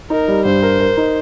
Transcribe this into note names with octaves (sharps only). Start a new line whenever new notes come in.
D#4 A#4
G3
G2 C5
A#4
A#4
D#4